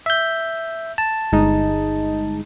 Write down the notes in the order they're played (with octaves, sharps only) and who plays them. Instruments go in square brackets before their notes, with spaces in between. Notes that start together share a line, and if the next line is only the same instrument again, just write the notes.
[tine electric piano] E5 G6
A5
[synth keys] G1 G#3 D#4